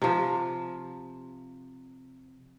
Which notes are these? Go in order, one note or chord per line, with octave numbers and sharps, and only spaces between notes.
C3 F3